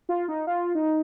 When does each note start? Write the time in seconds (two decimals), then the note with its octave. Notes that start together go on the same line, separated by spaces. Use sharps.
0.09 F4
0.28 D#4
0.47 F4
0.75 D#4